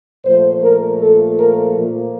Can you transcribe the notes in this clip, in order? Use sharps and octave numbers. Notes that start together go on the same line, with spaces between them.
A#2 F3 A3 C5
A#4
A4
A#4
A#2 F3 A#3